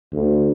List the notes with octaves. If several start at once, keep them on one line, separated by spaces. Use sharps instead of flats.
D2